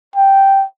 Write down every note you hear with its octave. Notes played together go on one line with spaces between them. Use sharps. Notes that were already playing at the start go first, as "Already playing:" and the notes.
G5